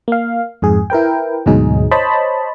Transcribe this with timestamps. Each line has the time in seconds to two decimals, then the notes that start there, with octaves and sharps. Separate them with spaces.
0.08 A#3 F5
0.62 F2 G#2 G#4
0.90 E4 A#4 B4 G5
1.46 D2 G#2 B2 F#3 D#4 G#4
1.91 C5 C#5 D#5 A5 B5